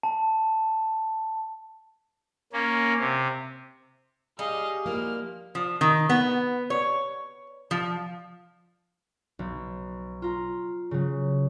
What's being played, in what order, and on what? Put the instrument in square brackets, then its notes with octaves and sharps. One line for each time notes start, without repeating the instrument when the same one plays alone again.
[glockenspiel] A5
[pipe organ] A#3 C#4
C3
[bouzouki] G3 [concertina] G#4 [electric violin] D#5 F5
[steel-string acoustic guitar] F3 A#3 E4 [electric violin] F6
[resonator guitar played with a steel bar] F3
D#3
B3
C#5
F3
[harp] B1
F4 A#5
C#3 F#3